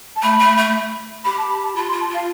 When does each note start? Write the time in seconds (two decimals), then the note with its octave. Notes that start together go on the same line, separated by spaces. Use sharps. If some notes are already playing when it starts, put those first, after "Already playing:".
0.16 A5
0.22 A3 B5
0.39 A3
0.57 A3
1.24 G4 B5
1.38 A5
1.50 B5
1.63 A5
1.75 F4 B5
1.88 C6
1.92 F4
2.01 A5
2.10 F4 F5